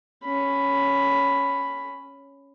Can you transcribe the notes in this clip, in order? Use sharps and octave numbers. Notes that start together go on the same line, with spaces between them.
C#4 B5